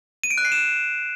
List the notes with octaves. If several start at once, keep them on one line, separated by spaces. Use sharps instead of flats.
D#7
D7
F#6
C7
E7